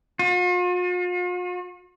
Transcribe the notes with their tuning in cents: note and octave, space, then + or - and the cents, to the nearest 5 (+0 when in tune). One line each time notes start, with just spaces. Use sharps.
F4 +45